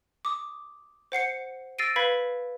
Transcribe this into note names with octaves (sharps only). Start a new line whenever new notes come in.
D6 D#6
C5 F#5 C7 C#7
E6 A6 A#6 C7 D7 D#7
B4 F5 B5 G#6 B6